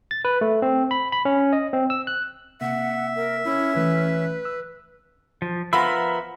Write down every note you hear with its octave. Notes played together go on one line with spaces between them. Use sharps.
A6
B4
A3
C4
B5
B5
C#4
D#5
C4
E6
F#6
C3 A#3 E5 F#5
A#4
C#4 E4
C2 E3 A3 B4
E6
F3
F3 B3 A#4 E5 B5